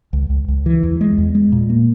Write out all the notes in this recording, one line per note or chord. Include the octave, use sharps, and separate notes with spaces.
C#2
C#2
C#2
E3
E2
G#3
E2
G#3
A#2
A#3